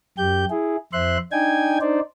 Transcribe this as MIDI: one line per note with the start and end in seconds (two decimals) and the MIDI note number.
0.18 0.45 42
0.18 0.45 67
0.18 0.45 91
0.50 0.76 64
0.50 0.76 68
0.93 1.18 41
0.93 1.18 72
0.93 1.18 76
0.93 1.18 84
0.93 1.18 90
1.32 1.78 62
1.32 1.78 63
1.32 1.78 79
1.32 1.78 80
1.32 1.78 92
1.81 2.00 62
1.81 2.00 63
1.81 2.00 72
1.81 2.00 74